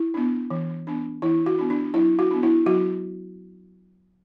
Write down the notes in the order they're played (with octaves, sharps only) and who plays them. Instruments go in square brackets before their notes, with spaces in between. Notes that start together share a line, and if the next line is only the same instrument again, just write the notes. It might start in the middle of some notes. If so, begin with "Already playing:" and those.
Already playing: [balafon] E4
B3 D4
E3
B3 D4
E3 E4
F#4
B3 D4
D4
F#3 E4
F#4
B3 D4
E4
F#3 F#4